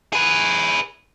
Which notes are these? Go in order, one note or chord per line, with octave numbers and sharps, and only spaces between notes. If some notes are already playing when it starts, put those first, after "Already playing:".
G#4 B4